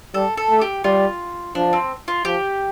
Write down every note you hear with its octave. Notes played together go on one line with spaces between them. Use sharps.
G3 A4
A4
A3
G4
G3 F4
F3 D4
C4
F4
F3 G4